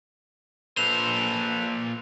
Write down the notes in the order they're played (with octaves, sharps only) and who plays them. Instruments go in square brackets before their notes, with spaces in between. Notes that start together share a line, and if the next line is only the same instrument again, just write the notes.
[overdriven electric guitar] A#2 C5 [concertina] A4 B4 [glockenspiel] F7